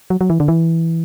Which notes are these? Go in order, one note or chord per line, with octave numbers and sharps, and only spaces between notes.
F#3
F#3
E3
D3
E3